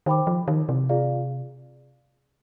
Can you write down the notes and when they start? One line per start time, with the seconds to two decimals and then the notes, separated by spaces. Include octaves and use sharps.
0.06 D#3 C5 G5 B5 D6
0.27 F3
0.48 D#3
0.69 C3
0.89 F4 G#4 D5 F5